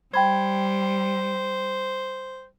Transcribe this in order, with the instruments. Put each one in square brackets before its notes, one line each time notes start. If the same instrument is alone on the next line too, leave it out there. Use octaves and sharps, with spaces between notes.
[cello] G3 [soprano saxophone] C5 [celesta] G5 B5 G#6